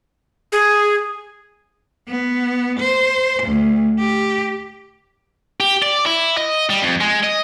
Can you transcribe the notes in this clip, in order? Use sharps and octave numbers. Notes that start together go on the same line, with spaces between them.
G#4
B3
C5
D2
G4
G4
D5
E4
D#5
G3
F2
G#3
D#5